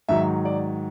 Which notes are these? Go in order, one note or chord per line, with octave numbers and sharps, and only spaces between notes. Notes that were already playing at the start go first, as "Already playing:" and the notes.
G#2 D#3 F#3 E5
D5